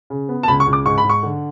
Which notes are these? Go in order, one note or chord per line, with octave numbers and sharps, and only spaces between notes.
C#3
B3
A5
C#2 B5
C#6
C#2
D6
G#2 C#6
B5
G#2
C#6
D3